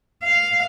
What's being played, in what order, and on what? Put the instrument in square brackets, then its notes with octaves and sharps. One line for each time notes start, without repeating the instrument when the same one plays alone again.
[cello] F5